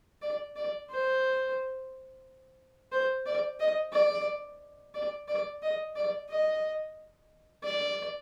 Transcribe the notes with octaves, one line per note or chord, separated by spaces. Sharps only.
D5
D5
C5
C5
D5
D#5
D5
D5
D5
D#5
D5
D#5
D5